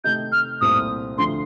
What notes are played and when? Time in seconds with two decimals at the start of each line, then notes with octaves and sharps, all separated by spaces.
0.04 C3 D#3 A3 D#4 G6
0.32 F6
0.61 C2 A#2 A3 C4 D#6
1.18 D2 D3 F3 C6